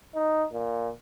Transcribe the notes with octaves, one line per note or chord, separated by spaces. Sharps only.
D#4
A#2